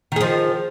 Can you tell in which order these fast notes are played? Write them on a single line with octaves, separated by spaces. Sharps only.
D#3 G#4 F3